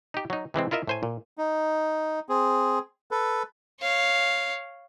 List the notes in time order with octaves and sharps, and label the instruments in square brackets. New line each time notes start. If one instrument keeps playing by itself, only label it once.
[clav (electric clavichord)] D#4 G4
F#3 D#4
C3 E3 G#3 C4
E4 F4 A#4 D#5 E5
A2 C5 G#5
A#2
[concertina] D#4
C4 G#4
A4 B4
[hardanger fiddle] C#5 F5